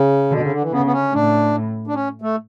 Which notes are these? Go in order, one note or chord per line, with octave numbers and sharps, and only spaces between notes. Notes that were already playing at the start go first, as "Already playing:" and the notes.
Already playing: C#3
B2 D3
C#3
D3
E3
C#3 B3
B3
C#4
A2 D4
D4
C#4
A3